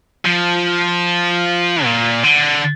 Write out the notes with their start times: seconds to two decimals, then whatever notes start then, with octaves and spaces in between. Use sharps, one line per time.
0.25 F3
1.85 A#2
2.24 D3